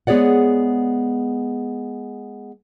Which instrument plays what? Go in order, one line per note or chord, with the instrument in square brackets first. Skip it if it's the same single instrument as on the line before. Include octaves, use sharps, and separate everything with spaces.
[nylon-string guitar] G#3 B3 G#4 C#5 D5 F#5